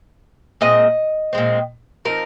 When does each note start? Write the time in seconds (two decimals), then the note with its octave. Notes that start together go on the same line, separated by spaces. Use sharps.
0.61 A#2 G#3 C4 D#5
1.33 A#2 G#3 C4
2.05 F3 C4 D#4 A#4